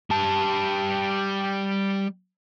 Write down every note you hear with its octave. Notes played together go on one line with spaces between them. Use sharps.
G3 A5